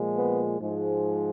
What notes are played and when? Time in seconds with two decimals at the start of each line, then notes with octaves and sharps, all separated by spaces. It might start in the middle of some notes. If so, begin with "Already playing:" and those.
Already playing: A#2 F3 G#3
0.13 B3
0.59 G#2 F3 G#3